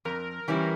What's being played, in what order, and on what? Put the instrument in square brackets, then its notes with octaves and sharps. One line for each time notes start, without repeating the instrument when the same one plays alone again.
[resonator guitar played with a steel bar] F2 [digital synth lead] A#4
[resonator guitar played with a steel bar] E3 G3 C#4 E4